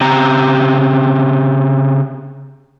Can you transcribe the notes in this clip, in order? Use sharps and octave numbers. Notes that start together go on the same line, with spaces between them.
C#3 C4 G4 A#5